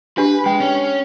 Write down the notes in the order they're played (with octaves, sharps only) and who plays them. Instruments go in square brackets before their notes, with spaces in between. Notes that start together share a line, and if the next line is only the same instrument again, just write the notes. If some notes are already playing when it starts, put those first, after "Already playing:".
[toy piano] D4 G4 [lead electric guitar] B4
[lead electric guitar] G#3 [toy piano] G5
[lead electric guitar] C#4